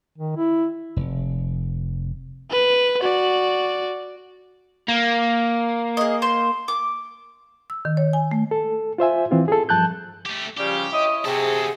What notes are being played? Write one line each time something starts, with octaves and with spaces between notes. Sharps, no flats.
D#3
E4
F1
B4
F#4 D5
A#3
G#4 D#5
C5
D6
E6
D#3
C#5
G#5
A3
A4
F4 C5 E5 G#5
E3 C4 F4
G#4 A4
G2 F3 A5 F#6 G6
A3 G4
C#3 F3 G3 G4
E4 C#5 D#5
C3 F#4 G#4 A4